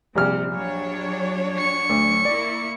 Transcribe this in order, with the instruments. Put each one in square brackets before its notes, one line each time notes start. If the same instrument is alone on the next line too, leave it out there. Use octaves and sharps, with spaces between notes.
[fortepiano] A#1 G3 F6 [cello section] C3
[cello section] F#3 D4 C#5
[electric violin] C#6 C#7
[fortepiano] D2
[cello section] A#3 E4 [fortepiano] D5